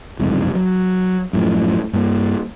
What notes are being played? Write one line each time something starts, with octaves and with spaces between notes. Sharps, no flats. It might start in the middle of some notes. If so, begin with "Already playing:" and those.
F#1 C2 F2 G#2
F#3
F#2 A2 F3
G2 A#3